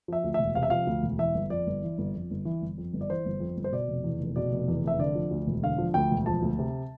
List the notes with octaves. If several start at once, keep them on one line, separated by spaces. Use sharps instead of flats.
F3 E5
D2
E1 E5
C3 F5
E5
F3 F5
D2
E1
E3 E5
G1
F2 D5
G1
E3
G1
F2
G1
E3
G1
F2
G1
D5
E3 C5
G1
F2
G1
C5
B2 D5
F1
E2
F1
B2 D5
F1
E2
F1 E5
D3 D5
F3
D2
E1
D3 F5
F3
D2 G5
E1
F3 A5
D2
C3